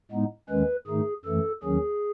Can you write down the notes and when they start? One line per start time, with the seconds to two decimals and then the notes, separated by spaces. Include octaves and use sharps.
0.11 A2 G#3 B3 D#4
0.49 D#2 D#3 G#3 C#4 B4
0.87 G#2 D#3 A3 D#4 G#4
1.25 F#2 E3 A3 A4
1.63 D#2 D#3 F#3 C#4 G#4